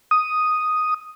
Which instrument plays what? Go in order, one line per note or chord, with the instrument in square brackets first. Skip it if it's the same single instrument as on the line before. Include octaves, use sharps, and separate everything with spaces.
[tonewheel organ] D#6